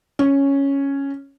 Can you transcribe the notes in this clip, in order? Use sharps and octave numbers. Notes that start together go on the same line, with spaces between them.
C#4